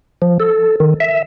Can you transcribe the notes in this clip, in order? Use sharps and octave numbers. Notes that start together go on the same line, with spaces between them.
F3
A4
D#3
E5